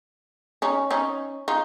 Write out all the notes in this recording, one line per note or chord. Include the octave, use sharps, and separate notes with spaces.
C#4 D#4
C#4 D#4
D#4 F4